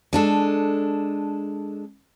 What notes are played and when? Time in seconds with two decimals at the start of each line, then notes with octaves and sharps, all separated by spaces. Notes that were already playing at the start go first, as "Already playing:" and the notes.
0.13 G#3 D4 A4